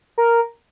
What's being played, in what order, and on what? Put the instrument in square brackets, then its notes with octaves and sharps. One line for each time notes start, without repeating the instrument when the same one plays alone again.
[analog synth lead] A#4